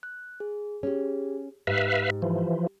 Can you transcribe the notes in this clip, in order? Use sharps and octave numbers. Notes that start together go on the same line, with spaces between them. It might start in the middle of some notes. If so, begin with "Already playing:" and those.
F#6
G#4
C#4 G4 G#4
G#2 G4 B4 E5 F5
E3 F3